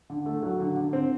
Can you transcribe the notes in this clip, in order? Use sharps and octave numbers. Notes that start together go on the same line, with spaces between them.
D3
A3
F#3
D3
D3
C4